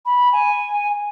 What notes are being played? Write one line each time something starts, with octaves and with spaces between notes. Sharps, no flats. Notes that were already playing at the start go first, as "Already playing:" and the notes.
B5
G#5